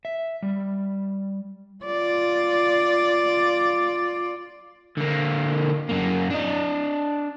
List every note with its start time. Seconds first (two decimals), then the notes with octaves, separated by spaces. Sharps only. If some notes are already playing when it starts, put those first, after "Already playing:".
0.05 E5
0.42 G3
1.85 F4 D5
4.98 D3 A#3
5.89 F#2 A#3
6.30 D4 D#5